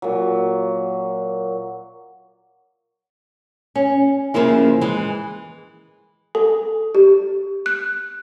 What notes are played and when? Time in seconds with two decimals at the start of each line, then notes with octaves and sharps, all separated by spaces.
0.02 A#2 F#3
3.75 C#4
4.34 F2 C#3 F3 A#3 E4
4.81 E3 G#3
6.35 A4
6.95 G4
7.66 F#6